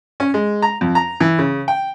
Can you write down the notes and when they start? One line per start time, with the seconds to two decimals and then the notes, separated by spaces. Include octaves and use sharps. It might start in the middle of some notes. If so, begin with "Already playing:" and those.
0.20 C#4
0.34 G#3
0.62 A#5
0.81 F2
0.95 A#5
1.20 E3
1.38 C#3
1.68 G5